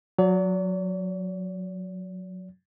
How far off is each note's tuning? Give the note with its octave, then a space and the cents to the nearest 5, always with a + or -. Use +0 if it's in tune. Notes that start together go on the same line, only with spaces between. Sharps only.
F#3 -20 D5 -45